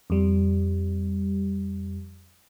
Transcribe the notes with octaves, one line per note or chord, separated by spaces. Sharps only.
F2 G3